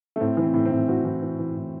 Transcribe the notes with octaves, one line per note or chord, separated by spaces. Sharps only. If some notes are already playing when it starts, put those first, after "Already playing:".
A3
A2 C4
E3
C4
A2
C4
A2
E3 F#4
E3
E3
E3
A2